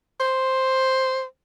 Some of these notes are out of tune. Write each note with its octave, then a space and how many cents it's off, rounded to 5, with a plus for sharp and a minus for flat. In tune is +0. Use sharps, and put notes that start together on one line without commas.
C5 +5